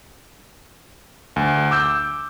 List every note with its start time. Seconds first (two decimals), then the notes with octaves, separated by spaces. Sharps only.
1.36 D2
1.71 D6 E6 G6